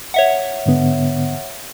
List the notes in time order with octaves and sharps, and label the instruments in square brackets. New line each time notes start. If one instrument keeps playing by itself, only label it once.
[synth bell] C#5 E5 F#5
[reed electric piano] G#2 D3 B3